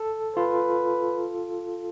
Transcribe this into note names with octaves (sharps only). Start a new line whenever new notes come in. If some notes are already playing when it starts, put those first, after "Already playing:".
Already playing: A4
F4 B4